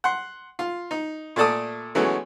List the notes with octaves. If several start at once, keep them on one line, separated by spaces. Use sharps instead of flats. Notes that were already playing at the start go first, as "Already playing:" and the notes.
F#5 C6
F4
D#4
A#2 A3 A4 D5 A5 D#6
E3 F#3 G#3 A3 B3 C#4